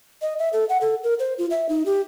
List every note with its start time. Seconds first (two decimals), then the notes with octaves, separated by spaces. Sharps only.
0.22 D#5
0.39 E5
0.53 A4
0.69 F#5
0.81 A4
1.03 A#4
1.19 C5
1.38 F4
1.50 E5
1.69 D#4
1.86 G4